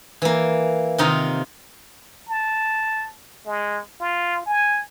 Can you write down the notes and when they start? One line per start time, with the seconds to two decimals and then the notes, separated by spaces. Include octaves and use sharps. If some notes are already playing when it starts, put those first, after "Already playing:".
0.22 E3 A#3
0.98 C3 D#3 D#4 F4 A#5
2.29 A5
3.46 G#3
4.00 F4
4.46 G#5